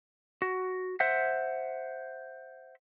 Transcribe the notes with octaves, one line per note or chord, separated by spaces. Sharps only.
F#4
C5 E5 F#5